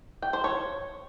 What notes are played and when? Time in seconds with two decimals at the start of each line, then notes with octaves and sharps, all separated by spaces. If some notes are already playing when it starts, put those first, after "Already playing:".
0.22 G5
0.33 C5
0.44 C#5